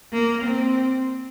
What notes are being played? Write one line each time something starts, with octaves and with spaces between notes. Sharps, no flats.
A#3
C4